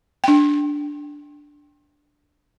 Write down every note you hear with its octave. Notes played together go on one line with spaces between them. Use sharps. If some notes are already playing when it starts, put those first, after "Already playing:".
D4 G5